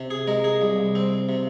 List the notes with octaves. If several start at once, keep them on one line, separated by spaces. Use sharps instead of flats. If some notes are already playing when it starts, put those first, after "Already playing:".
Already playing: C3
G#4
G#3 A#4
G#4
C2
C4
C3